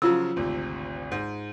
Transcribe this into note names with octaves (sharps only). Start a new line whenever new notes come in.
C#3 F3 F#3 F4 E6
G#1 D2 C3
G#2